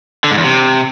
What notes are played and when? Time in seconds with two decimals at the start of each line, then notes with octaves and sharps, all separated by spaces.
0.24 D3
0.31 G#2
0.38 E2
0.44 C3